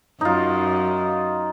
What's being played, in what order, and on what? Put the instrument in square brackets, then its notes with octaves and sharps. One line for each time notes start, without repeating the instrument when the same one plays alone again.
[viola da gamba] F#2 [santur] D#4 F4